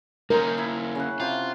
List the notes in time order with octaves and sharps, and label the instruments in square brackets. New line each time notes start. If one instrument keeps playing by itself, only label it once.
[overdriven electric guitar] A#3 C#4 [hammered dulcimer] D#4 C6 [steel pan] A#4
[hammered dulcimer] E4
C#3 F#5
[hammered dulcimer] C3 C5 [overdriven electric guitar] F4